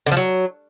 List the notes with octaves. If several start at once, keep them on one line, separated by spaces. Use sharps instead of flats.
D3
F3
F#3